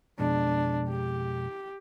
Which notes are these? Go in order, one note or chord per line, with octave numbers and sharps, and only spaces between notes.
F2 B2 G#3 D4
G4